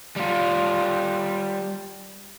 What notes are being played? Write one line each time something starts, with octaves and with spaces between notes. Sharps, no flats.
G3 F4